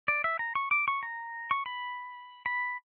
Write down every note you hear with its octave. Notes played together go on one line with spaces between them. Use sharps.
D5
E5
A#5
C#6
D6
C#6
A#5
C#6
B5
B5